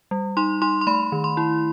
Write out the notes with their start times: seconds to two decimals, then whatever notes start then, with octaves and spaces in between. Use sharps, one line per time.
0.11 G3
0.37 D#4 C6
0.62 D#4 C6
0.81 C6
0.87 A3 B5
1.12 D#3
1.24 C6
1.37 E4